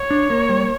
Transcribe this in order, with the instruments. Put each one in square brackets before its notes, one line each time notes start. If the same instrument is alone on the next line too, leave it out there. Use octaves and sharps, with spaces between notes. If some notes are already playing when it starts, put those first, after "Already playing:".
Already playing: [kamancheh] C#5
[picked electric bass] D4
A#3
G3